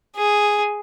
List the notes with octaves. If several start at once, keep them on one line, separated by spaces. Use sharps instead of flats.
G#4